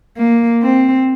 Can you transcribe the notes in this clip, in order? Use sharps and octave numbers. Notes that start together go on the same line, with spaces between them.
A#3
C4